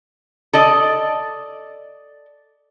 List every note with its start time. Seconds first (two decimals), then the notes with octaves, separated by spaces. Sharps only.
0.53 A4 D5 D#5